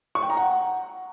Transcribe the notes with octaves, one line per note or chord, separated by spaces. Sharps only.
C#6
G5
A#5
F#5